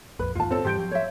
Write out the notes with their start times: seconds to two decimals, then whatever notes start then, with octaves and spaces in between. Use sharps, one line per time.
0.19 A#1 F2 B4
0.35 E2 G#2 D#3 F4 A5
0.51 C4 A4
0.65 G#2 E3 G3 G4 C6 G6 D7
0.78 F3 F#3
0.91 C#5 E5